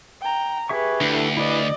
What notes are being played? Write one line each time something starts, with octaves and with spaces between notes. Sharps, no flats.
G5 A#5
G4 G#4 B4 E5 C#6
D2 D4 E4 A4
E4 G4 B4 D5 D#5